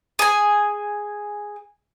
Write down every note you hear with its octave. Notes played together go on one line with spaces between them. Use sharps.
G#4 G#5